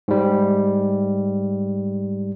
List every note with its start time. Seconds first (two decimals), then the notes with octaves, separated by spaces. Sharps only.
0.08 G#2 G3